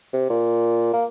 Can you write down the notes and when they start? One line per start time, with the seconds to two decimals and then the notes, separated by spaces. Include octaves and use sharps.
0.13 C3
0.30 A#2
0.93 A#3